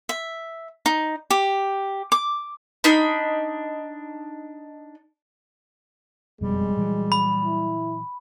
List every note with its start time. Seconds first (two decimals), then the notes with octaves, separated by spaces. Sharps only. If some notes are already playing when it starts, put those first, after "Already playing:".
0.09 E5
0.86 D#4
1.30 G4
2.12 D6
2.84 D4 D#4 B5
6.41 F#1 F2 B2 G3 G#3
6.77 A#2 E3 F#3
7.12 B5
7.44 E4